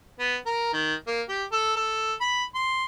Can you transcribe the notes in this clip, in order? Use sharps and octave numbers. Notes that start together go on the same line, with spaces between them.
B3
A#4
D#3
A#3
G4
A4
A4
B5
C6